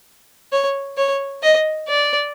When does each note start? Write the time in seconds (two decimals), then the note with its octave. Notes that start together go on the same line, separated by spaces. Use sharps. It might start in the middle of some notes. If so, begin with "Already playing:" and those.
0.52 C#5
0.98 C#5
1.42 D#5
1.88 D5